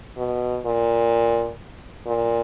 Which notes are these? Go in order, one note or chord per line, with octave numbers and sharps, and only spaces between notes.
B2
A#2
A#2